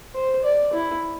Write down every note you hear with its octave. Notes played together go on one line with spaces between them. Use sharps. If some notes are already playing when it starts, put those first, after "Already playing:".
C5
D5
E4